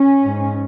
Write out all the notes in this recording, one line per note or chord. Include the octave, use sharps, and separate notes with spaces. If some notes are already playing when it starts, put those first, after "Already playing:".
Already playing: C#4
G#2